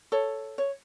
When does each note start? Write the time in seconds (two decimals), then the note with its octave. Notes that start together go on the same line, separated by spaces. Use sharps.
0.12 A4 C#5
0.58 C#5